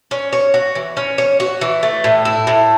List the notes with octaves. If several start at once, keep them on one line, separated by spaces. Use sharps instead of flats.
C#4
C#5
F#4
E3
C#4
C#5
F#4
E3
A3
A2
E4
A2